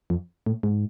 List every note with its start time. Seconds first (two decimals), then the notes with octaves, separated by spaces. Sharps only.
0.10 F2
0.46 A2
0.63 G#2